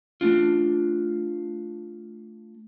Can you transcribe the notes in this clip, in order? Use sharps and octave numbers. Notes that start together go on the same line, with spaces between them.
A3 C#4 D4 F4